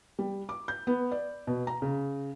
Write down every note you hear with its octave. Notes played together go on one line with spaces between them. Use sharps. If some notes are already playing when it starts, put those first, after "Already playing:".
G3
D6
G6
B3
D5
B2
A#5
C#3